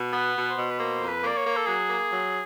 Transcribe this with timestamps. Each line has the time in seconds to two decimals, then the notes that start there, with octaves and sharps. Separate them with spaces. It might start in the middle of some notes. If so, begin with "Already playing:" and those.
Already playing: B2
0.12 B3
0.35 B2
0.49 C5
0.56 B2
0.71 B4
0.78 A#3 C5
1.01 F2
1.08 B4
1.22 A#3
1.27 D5
1.37 C#5
1.45 A#3
1.56 A4
1.67 F#3 G#4
1.88 A#3
2.10 F#3